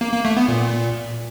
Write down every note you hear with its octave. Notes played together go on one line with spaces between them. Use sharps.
A#3
A#3
A3
B3
A#2